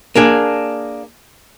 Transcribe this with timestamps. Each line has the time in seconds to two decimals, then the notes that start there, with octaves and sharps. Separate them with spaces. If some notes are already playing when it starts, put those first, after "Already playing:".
0.15 A#3 D4 G#4